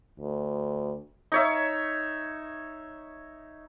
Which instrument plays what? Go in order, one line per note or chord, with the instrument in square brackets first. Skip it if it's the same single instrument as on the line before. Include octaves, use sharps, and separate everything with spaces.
[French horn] D2
[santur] D#4 C#5 E5